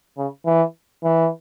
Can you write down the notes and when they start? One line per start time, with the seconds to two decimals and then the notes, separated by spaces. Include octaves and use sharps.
0.18 C#3
0.46 E3
1.03 E3